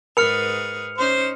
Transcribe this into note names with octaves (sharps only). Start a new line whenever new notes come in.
G#2 G#4 A#4 B4 B5 F6 C#7 F7
C#4 D#4 C5